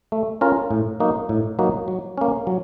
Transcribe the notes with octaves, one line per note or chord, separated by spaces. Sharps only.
A3
C#4 F4 A#4
A2
F#3 A#3 D#4 F#4
A2
F#3 A#3 D#4 F#4
F#3
A#3 C#4
F#3